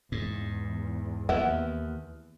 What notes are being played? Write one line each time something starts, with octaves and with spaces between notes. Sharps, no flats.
E2 G#2
D#2 B3 E4